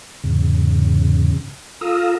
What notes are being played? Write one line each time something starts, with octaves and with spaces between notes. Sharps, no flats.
E2 G#2 C#3
F4 A4 F5 A#5 D#6 E6